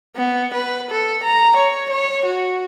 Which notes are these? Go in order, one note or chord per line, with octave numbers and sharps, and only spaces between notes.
B3
B4
A4
A#5
C#5
C#5
F#4